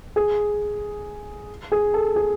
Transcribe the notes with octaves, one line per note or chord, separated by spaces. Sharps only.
G#4
G#4
A4
G#4